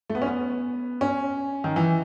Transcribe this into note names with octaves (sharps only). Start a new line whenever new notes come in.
A3
B3
C#4
B3
C#4
D#3
E3